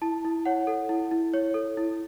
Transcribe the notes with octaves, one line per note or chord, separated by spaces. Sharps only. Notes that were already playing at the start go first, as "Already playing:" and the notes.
E4 A5
E4
C#5 F#5
A4
E4
E4
C#5
A4
E4